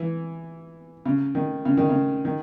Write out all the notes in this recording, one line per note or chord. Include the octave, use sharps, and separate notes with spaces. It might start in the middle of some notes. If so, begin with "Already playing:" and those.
Already playing: E3
C#3
D#3
C#3
D#3
C#3
D#3